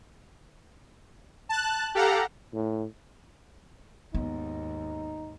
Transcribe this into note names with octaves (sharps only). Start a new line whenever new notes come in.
A5 F#6
G4 A4 F5 F#5 A#5
A2
D#2 G#2 B3 D#4